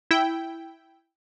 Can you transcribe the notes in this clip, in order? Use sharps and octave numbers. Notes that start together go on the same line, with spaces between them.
E4 G5